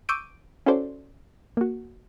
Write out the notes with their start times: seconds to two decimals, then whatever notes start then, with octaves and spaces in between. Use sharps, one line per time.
0.09 C#6 D6 E6 G6 D7 D#7
0.66 C#4 E4 F#4 A4 C5 D5
1.57 A#3 F#4